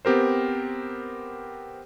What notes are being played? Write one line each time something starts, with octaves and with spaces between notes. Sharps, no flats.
B3 C4 G4 A#4 C5